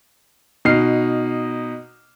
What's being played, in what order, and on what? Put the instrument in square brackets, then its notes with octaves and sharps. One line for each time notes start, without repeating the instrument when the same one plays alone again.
[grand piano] B2 D#4 F6 C7